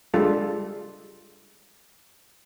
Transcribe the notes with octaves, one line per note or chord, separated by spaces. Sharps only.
G3 G#3 D4 F4 A4